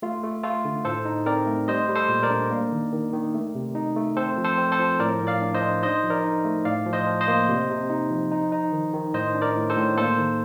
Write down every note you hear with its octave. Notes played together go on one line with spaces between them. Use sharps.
A3 F4
A3
A3 F4 A4
D3
A2 A4 C5
D#4
C4 A#4 D5
A3
G3 C5 D#5
G3
A4 C5
A#2
A#4 D5
D4
A#3
D#3
D#3
D#3
A3
C3
D#4
A3
C4 A4 C5
F3
A4 C5
C4
A4 C5
F3
A2 A#4 D5
A2
D5 F5
D4
C5 D#5
D4
D#4 C5 D#5
F3
A#4 D5
D#4
A3
A2 D5 F5
F3
C5 D#5
F3
C5 D#5
A#3
C3
C3
D#4
F3
D#4
D#4
D#3
D#3
A2 C5 D#5
D4
A#4 D5
A2
A4 C5
A2
A#3 A4 C5
D#3